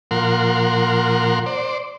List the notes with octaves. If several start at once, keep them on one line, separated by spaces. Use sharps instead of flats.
A#2 F3 A#4 F#5 C6
C5 D5